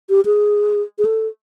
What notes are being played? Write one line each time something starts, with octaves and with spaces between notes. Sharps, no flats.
G4
G#4
G#4
A4